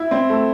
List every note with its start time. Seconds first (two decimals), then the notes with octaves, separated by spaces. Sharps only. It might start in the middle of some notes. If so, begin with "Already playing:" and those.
Already playing: E4
0.11 C4
0.30 A3